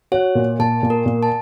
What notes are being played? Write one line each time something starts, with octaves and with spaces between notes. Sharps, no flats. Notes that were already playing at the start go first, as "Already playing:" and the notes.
F#4 C#5
A#2
A#2 A5
A#2
A#4
A#2
A5